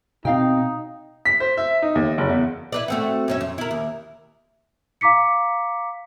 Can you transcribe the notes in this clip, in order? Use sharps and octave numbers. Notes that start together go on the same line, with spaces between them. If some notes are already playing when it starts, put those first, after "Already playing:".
B2 C4 D#4 F5 G5
B6
C5
E5
D#4
D#2
F#1
E2
E4 B4 D5
A3 C4 F#4
F#2 C#4 E5
F2
E4 A#4
D#2
F5 A#5 D6 B6 C#7